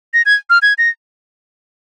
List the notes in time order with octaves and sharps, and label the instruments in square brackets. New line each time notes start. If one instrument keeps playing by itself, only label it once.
[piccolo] A#6
G#6
F6
G#6
A#6